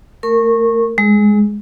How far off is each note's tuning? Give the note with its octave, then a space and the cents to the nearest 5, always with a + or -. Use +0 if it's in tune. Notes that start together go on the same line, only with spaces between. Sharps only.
A3 +25 A#4 -20 C#6 -20
G#3 +0 G#4 +15